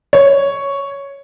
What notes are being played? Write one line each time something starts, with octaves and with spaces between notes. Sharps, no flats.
C#5